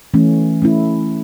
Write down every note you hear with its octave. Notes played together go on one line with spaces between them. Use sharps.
E3 A3 C#4
A3 C#4 E4